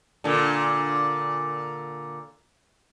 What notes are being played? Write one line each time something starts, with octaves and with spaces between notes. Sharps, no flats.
A#2 D3